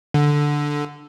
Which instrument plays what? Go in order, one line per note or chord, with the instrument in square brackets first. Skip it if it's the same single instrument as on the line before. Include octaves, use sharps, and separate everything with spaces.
[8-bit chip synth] D3